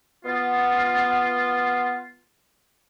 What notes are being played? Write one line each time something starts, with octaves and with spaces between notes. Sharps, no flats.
B3 F4